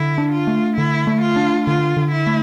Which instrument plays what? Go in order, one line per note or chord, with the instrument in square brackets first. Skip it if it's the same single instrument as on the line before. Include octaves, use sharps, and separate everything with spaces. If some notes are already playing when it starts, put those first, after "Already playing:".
Already playing: [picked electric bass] D3 [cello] E4
[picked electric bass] D4
[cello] F4
[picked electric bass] A3
[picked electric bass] D3 [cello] E4
[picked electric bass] A3
[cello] F4
[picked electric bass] D4
[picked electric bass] D3 [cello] F4
[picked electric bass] D3
[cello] E4
[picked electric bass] A3